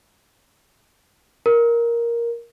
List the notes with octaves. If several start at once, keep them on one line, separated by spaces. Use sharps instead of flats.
A#4